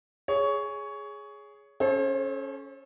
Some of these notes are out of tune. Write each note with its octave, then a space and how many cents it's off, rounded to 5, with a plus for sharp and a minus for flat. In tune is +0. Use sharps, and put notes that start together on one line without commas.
G#4 +0 C#5 +15
C#4 +0 A4 -30 C5 +40